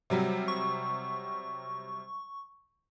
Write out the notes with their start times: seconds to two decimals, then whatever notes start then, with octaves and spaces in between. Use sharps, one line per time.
0.10 C3 F#3 G3
0.48 C#6